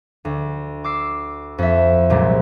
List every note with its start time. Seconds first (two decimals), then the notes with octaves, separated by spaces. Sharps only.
0.25 D2
0.84 D6 E6 C7
1.58 F2 E5
2.10 C2 A#2 F#3 G#3